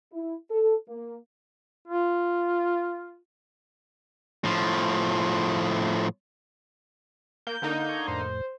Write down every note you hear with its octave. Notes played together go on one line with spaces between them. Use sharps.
E4
A4
A#3
F4
A2 F3
A#3 G6
D3 A#3 D#4
C#6 G#6
F2 A2 C5